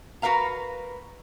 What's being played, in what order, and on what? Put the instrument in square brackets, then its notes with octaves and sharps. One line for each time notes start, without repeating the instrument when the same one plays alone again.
[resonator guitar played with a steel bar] F#4 A#4 B4 F5 A#5